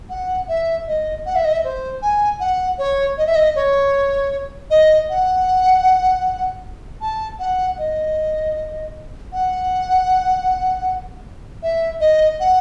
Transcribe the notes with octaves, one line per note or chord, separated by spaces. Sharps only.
F#5
E5
D#5
F#5
E5
D#5
E5
C5
G#5
F#5
C#5
D#5
E5
D#5
C#5
D#5
F#5
A5
F#5
D#5
F#5
E5
D#5
F#5